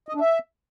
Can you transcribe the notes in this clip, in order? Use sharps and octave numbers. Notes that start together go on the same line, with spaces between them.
D#5
D4
E5